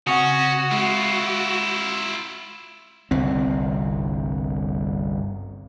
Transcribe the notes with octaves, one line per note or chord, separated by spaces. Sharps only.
C#3 C4 C#4 F#4 F#5 C#6 D#6
G#3 E4 F4
G1 C2 C4